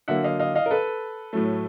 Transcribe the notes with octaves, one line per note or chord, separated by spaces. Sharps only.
D3 F#3 A#3 E5 F#5
D#5 F5
D#5 F5
D#5 F5
A#4
A4 B4
A2 F#3 A3